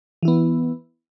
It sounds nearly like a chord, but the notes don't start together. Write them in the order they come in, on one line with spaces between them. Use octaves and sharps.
E3 E4 B3